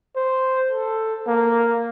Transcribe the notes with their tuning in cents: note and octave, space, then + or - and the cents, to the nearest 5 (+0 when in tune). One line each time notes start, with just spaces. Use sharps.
C5 -5
A4 +10
A#3 -5